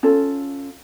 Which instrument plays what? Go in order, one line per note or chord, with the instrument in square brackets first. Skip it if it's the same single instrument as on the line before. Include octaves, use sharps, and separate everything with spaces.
[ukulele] C#4 F4 A4